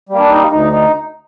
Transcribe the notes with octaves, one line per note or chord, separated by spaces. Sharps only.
G3 A#3
D4
D#4
D2 D#4
D#4